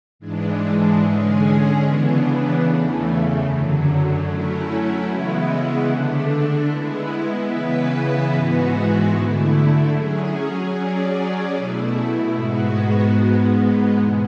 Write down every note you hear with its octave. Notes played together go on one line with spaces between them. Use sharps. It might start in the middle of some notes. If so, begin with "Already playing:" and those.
G#2 E3 G#3 D4
D3 G#3 C#4 G#4
C#3 E3 B3 D4
E2 C#3 E3 A3
F#2 D3 F#3
F#3 A3 C#4 E4
C#3 E3 G#3 B3 E4
D3 A3 D4
G#3 B3 E4
C#3 E3 B3 E4 B4
G#2 E3 G#3 B3 F#4
D3 A3 E4
F#3 C#4 G#4
F#3 C#4 G#4 D5
B2 A3 E4
G#2 G#3 B3 F#4
G#2 G#3 B3
E2 B2